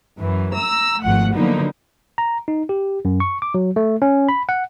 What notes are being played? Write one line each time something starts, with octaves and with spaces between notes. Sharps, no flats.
F#2 E3
A#5 E6
G#1 G#2 F3 A3 F#5
D3 F3 F#3 A#3 B3 D#4
A#5
D#4
G4
F#2
C#6
D6
F#3
A3
C#4
B5
F#5